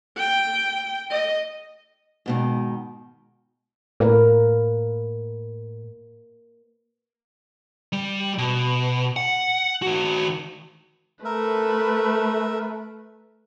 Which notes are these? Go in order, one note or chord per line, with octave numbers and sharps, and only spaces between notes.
G5
D#5
G#2 B2 D#3
A2 A#3 A#4 B4
G3
B2
F#5
D#3 F#4
A3 A#4 B4 E5